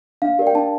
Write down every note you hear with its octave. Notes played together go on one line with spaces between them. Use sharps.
D4 F5
G4 A#4 D5
G5
D4 A5